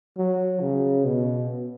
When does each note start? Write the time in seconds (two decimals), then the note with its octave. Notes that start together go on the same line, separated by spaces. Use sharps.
0.18 F#3
0.61 C#3
1.05 B2